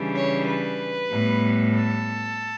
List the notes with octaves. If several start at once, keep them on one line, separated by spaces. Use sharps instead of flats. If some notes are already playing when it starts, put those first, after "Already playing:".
Already playing: C#3 E3 G3 D4
C#5
B4
A2 G3 B3
A4